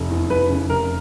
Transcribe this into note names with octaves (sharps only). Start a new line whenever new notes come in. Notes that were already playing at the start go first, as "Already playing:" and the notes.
Already playing: F1
E2
F1 B4
C#3
F1 A#4